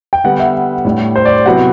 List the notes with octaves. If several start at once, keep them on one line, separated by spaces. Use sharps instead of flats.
G5
D3 G3 B3 F#5
E5
A2 G3 D4
C5
D5
C3 F#3 B3 E4 F#5